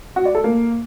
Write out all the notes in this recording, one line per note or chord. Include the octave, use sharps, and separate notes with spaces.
F#4
D5
A4
A#3